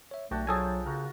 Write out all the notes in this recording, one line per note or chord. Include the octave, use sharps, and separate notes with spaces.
C#5 E5
B1 A3 D4 F#4 G5
F3 F#3 G#4 A4 G#5 A5
C#3 F#4 A#4